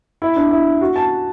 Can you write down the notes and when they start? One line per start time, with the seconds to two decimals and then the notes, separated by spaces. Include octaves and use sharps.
0.22 E4
0.36 D4
0.51 E4
0.81 F#4
0.96 A5